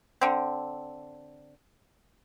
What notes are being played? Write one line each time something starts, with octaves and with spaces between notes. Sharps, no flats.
D3 C4